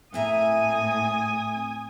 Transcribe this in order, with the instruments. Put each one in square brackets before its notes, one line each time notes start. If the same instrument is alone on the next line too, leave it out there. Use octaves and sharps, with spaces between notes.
[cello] A2 [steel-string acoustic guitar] C4 E5 A#5 [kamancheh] G#5 D#6